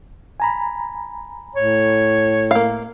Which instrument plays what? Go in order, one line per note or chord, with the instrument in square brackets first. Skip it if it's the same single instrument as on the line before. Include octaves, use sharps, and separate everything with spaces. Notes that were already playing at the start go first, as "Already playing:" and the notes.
[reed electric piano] G#5 A#5 B5
[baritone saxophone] A2 [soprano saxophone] C#5
[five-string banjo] A#3 F5